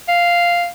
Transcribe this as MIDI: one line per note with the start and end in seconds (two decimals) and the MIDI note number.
0.08 0.68 77